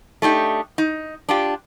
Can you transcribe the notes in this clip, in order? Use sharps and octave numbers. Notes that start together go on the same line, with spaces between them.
A3 D4 D#4 G4
D#4
D4 F4 G4